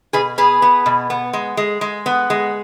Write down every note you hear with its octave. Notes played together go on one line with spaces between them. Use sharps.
B2 G#4 B4
B3 G#4 B4
B3
B2
B3
G#3
G#3
G#3
B3
G#3